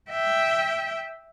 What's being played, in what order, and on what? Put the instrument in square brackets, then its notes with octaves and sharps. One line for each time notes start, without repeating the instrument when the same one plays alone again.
[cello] E5 G5